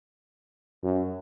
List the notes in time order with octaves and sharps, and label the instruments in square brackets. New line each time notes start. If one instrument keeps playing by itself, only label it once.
[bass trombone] F#2